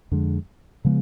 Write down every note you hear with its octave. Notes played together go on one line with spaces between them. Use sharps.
F2 D3 G#3
C#3 F3 G#3 B3